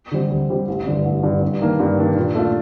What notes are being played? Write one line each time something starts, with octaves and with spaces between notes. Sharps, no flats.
D3 G3 C4 G4
D2
D3 G3 C4 G4
A1
G2 D3
A1
G2 D3
G2
D#3 A#3 D4
G2
D#3 A#3 D4
A#2
A3 D4 F4